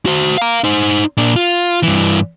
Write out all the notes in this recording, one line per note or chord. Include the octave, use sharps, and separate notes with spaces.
F#4 C5
F5 A#5
D#4 C5
A#2 D4
F4
G2 E3